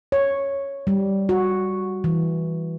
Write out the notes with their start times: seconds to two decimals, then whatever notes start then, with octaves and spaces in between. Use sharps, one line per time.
0.12 C#5
0.87 G3
1.29 F#4
2.04 E3